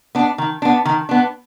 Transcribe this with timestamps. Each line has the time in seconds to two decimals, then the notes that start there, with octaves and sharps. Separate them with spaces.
0.15 B3 D4
0.38 D#3
0.62 B3 D4
0.85 D#3
1.09 B3 D4